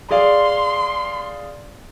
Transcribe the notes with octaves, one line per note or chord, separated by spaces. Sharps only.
G#4 D5 F5 C6